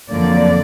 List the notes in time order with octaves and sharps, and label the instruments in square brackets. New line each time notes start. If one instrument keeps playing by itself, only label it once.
[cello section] F2 D3 F#3 A#3 D5